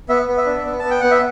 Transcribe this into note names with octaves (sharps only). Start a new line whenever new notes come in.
B3 E5
B3
E5
D4
B3
B3 A5
G5
B3 F#5
E5